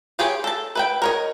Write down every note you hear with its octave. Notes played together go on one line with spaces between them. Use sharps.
F4 G4 G#4 C#5
A4 A5
B4 E5 G5
A#4 C#5 D#5